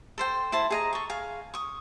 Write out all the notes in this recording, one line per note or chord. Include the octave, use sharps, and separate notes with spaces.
A4 C5 G5
E4 C5 A5
G#4 D#5 A#5
A4 C#6
G#4 F5
C#6 D#6